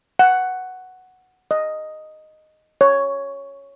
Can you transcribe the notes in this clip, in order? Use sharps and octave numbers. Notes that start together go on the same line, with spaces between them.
F#5
D#5
C#5